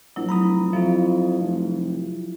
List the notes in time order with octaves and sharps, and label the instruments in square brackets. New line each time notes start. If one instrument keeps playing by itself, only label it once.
[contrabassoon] A#1 [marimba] F#3 E4
[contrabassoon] F1 [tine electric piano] A#5 B5 D#6
[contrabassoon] F2 [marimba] F3 [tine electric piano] E4 F4
[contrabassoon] F1